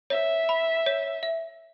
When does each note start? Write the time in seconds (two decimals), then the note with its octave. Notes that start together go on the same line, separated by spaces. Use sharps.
0.10 C#5 E5
0.49 B5
0.86 C#5
1.23 E5